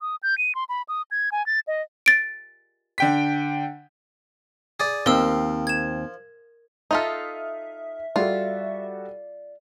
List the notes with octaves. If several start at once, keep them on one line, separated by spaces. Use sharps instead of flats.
D#6
G6
D#7
C6
B5
D#6
G#6
G#5
A6
D#5
A6 D7
D3 G5 B6
G#4 D5
D#2 F3 C4 A#4 E6
G#6 E7
D#4 F4 A4 E5 D#6 F6
G3 F4 F#4 A4 D5